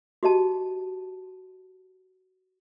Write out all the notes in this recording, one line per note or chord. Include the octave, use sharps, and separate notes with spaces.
F#4 G4 D#5 A5